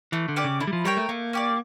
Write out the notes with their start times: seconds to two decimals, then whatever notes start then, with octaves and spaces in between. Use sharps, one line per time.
0.12 E3 A3
0.29 D3
0.36 C#4 G4 D5
0.44 C#3
0.60 D3 E4
0.67 G3
0.73 F3
0.85 G3 A#4 C#5 G5
0.97 A3
1.09 A3 A#3
1.33 C#4 G4 D5